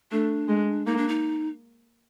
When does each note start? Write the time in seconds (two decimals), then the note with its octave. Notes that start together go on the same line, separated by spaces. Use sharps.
0.11 A3 D4
0.49 G#3
0.86 A#3 D#4
0.97 D4
1.08 D#4